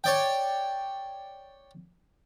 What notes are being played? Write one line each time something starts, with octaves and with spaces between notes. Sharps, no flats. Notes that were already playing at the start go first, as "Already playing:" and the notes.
C#5 D5 G5